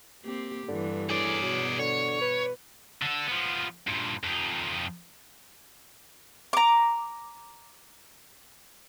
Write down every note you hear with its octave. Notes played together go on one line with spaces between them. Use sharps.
A#3 C4 G4
G2 D3 E3
A2 G#4 D5
B2 F#3
D3 C#5
B4
D3 A4
F3 B3
G2 A#2
F2 D#4
A#5 D6